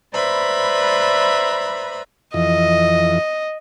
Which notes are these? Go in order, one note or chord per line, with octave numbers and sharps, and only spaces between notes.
B4 C5 D5 E5 A#5 B5
F2 E3 D#5